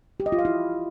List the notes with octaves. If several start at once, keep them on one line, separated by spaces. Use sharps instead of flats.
G4
D#5
F4
F5
E4